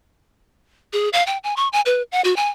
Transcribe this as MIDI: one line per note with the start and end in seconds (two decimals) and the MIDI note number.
0.93 1.09 68
1.13 1.25 77
1.27 1.38 79
1.44 1.54 80
1.57 1.68 85
1.73 1.81 80
1.86 2.02 71
2.12 2.21 78
2.24 2.36 66
2.36 2.50 80